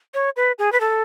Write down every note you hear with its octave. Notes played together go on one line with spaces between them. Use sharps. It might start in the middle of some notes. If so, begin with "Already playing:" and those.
C#5
B4
G#4
B4
A4